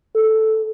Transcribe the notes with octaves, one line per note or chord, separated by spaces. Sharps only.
A4